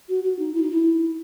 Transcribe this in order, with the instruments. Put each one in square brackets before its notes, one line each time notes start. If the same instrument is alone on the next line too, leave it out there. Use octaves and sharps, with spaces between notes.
[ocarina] F#4
F#4
D#4
E4
D#4
E4